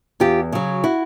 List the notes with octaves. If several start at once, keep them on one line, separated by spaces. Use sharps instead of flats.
E2 F4 G4
C#3 F#3
E4 F#4